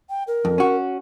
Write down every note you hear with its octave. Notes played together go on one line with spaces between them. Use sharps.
G5
A#4
F2
C#4 F#4